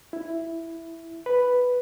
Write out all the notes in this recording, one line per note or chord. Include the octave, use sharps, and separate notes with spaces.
E4
B4